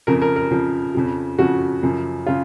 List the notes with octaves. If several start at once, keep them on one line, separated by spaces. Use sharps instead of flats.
F2 C#3 F3 A#4
A#4
A#4
F2 C#3 F3
F2 C#3 F3
F2 C#3 F3 F#4
F#2 C#3 F3
C#3 F4